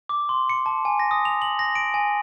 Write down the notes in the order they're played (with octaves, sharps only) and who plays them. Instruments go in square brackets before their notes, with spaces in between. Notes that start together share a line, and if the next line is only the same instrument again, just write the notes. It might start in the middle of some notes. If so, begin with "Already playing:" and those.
[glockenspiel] D6
C6
C#7
A5
G#5
A#6
D#6
F7
F#7
A#6
D7
G#5